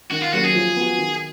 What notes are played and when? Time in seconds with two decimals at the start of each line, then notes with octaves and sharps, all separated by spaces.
0.11 D#3 F#4
0.22 F4
0.33 F#3 A#3 C#4 F#4
0.43 G#4
0.55 F3
0.77 B3 F#4
0.98 D#3